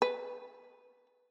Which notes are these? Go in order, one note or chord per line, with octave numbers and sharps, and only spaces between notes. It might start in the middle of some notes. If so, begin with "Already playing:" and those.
B4